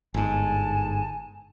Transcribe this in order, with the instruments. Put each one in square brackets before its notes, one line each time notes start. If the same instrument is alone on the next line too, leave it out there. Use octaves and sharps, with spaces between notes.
[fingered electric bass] G1 G#2 [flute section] G#5 A5